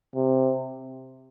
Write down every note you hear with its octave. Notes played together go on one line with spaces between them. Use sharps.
C3